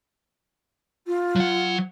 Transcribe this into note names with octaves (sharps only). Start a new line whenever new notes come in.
F4
F#3 F#5